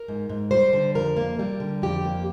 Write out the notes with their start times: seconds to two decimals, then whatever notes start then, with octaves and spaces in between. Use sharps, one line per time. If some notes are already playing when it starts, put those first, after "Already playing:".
Already playing: A#4
0.08 G#2
0.29 G#2
0.51 G3 C5
0.73 D3
0.95 F2 A#4
1.17 A#3
1.39 G3
1.60 D3
1.82 F2 G4
2.05 A#3